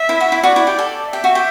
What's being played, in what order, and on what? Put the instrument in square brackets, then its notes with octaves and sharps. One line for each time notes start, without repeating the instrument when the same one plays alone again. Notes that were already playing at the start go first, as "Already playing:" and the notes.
Already playing: [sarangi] E5
[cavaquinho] E4
F#4
E4
[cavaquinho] F#4 [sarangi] D5
[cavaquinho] E4
G4
A4
[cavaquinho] G4 [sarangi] E5
[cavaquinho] F#4
G4